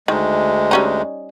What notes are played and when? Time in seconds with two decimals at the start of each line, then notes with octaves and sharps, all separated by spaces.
0.08 D2 D#3 G#3
0.71 G3 C#4 D#4